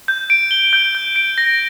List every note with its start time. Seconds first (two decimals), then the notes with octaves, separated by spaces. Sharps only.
0.08 G6
0.30 D7
0.51 G7
0.73 G6
0.95 G6
1.16 D7
1.38 A#6